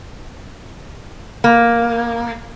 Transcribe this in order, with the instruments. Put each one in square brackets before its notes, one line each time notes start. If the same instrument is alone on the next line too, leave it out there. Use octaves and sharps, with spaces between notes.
[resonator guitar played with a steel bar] A#3